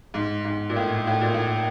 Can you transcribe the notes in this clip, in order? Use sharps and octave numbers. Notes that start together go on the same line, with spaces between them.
G#2
G#2
A#2
A2
A2
A#2
A2